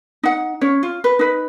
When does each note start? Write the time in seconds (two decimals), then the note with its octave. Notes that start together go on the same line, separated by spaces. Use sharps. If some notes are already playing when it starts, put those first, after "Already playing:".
0.23 D#4 F#5
0.61 C#4 C#5
0.83 F4
1.04 B4
1.19 D#4 B4